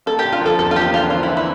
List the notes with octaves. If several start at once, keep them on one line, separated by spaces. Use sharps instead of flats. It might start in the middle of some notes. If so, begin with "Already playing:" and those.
A#3 A4
G4
D3
F4
F3 A4
E2 A4
F4
A#3 G4
D3 F4
C4 F4
E4
E3
E4